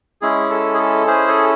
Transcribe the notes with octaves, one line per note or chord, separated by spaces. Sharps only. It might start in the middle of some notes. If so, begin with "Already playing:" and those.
G#3 C#4 E4 G#4
A4
G#4
A4
C#4 E4 G#4 C5
A4